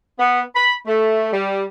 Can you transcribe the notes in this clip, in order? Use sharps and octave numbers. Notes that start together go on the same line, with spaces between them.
B3
B5
A3
G3